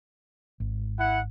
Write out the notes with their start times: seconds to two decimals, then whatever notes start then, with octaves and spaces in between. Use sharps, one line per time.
0.60 G#1
1.00 E4 F#5